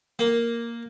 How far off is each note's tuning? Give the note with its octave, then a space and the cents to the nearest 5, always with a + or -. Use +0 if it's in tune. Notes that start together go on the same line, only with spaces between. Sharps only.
A#3 +0